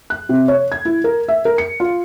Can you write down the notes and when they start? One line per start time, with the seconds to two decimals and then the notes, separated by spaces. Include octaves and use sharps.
0.10 F#6
0.29 C3
0.48 C#5
0.72 G#6
0.85 E4
1.04 A#4
1.28 E5
1.45 A#4
1.58 C#7
1.80 F4